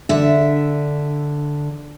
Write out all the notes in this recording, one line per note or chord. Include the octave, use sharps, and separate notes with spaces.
D3 D4 E5